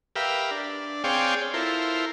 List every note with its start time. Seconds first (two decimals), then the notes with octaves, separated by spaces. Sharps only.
0.16 G4 A#4 B4 E5 F5
0.51 D4
1.04 C4 G#4 C#5 D5 F5 G5
1.54 E4 F4 A4 A#4 C5